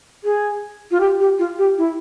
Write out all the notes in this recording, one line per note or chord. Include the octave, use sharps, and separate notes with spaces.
G#4
F4
G4
G4
F4
G4
E4